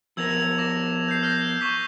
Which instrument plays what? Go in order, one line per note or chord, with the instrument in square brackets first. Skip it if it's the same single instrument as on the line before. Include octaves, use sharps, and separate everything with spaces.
[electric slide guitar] F3 B3 A#4 [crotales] E6 G#6 F7
[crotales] D6 A#6
G6 C7
F6 G6 A#6
C#6 D6 B6